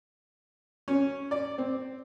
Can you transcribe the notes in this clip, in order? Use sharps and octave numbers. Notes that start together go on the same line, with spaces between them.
C#4
D5
C4